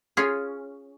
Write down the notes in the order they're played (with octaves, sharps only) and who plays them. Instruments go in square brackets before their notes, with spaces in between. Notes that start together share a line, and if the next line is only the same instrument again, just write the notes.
[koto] C#4 F4 G#4